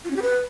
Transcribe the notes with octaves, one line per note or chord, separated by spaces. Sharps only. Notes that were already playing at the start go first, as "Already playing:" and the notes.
F4
C#4
G4
B4